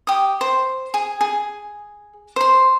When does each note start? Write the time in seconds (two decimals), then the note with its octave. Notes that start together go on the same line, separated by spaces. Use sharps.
0.07 G4 D#6
0.41 C5
0.94 G#4
1.21 G#4
2.36 C5 C6